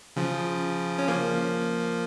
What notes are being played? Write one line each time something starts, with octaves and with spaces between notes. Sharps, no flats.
C#3 F3
C#4
F3 A#3